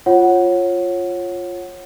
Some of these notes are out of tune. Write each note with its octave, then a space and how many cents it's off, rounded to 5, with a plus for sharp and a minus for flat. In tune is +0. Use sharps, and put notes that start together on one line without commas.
F4 +0 C#5 -20 F#5 +0